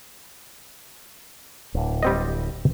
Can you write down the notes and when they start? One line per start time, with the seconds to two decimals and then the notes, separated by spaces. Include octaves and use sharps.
1.75 D1
2.03 G3 C4 D#5